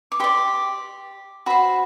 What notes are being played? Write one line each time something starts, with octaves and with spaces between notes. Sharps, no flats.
D6
G4 D5 C6
F#4 C5 B5